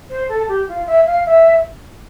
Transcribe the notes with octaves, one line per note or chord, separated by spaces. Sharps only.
C5
A4
G4
F4
E5
F5
E5